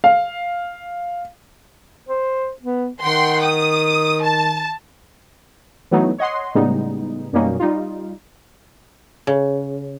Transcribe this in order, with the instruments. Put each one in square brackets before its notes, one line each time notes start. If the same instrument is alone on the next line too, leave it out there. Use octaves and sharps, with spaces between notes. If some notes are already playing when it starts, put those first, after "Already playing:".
[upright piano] F5
[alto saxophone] C5
B3
[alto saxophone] D#3 [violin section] F#5 G5 C6
[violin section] D#6
A5
[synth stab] E3 F#3 A3 B3 D#4
C#5 D#5 F#5 C6
A2 C#3 G3 G#3 B3 D#4
F#2 B2 G3 A#3 C#4 D#4
G3 D#4 F4
[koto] C#3